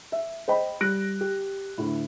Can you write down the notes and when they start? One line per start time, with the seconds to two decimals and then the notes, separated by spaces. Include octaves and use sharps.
0.12 E5
0.48 C5 D#5 G5 B5
0.81 G3 F#6 A#6 D7
1.21 G4
1.78 D2 A2